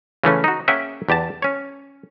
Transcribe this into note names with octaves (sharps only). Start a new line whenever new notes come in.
C#3 E3 A3 C#4
D#4 F#4
A#3 C#4 G#4 E5 F#5 G5
E2 G4 D5 A5
C#4 C#5